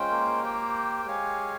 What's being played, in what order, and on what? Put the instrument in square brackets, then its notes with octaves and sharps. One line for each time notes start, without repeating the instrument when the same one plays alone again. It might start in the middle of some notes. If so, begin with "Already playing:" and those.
Already playing: [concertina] G#3 C#4 F4 C5 G5
[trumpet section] A#3
[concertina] G4 C5 G5
[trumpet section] G#3 [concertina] G4 C#5 F5 G#5